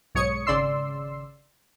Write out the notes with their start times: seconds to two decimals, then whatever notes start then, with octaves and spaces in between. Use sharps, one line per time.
0.15 B1 G#2 C#5 D#6 G#6 C#7
0.46 G#1 C#3 D5 C6 E6 C7